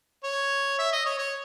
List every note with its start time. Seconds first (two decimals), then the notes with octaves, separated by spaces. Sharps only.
0.24 C#5
0.79 E5
0.92 D#5
1.06 C#5
1.19 C#5